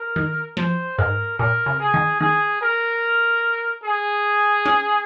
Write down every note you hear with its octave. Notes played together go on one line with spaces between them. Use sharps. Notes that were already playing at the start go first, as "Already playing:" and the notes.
Already playing: A#4
D#3
F3 C5
G#2 A#4
A#2 A#4
C#3
G#4
D#3
D#3 G#4
A#4
G#4
C#4